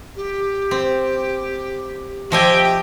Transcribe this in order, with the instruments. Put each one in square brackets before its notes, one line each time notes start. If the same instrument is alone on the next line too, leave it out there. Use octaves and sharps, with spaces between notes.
[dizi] G4
[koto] C4
[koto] F3 D#5 G#5 [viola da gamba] G4 [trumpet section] E5 G5